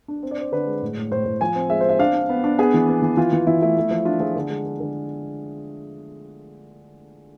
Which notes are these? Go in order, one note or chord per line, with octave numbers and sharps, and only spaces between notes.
D4
C4
D5
C4 C5
D3 B4
G#3
A2
A2
A2 C5
A2
F3 G#5
C4
G#3 E5
C5
C4 E5
D4 F5
D4
B3
D4
B3 G#4
E3
B3
E3
E3 F4
E3
E3 E4
A3 E4
A3
F3
D4 F4
F3 G#4
D3
G#3
G#3
D3